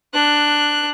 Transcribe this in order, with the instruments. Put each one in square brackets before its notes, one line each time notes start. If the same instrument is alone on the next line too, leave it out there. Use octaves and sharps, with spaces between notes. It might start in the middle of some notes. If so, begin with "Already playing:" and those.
[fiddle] D4 F#6